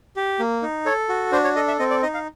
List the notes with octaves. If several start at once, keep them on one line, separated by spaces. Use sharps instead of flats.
G4
A#3
D#4
A4 C#5
F#4
D4 C5
C#5
A4 D#5
E5
C4 D#5
D5
D#4 D#5
F5